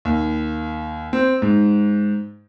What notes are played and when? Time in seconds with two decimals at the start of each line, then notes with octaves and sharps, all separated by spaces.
0.05 D#2
1.13 C4
1.42 G#2